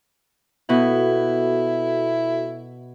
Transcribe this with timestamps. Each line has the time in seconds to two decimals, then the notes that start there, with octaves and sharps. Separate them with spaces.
0.69 B2 E4 F#4 A4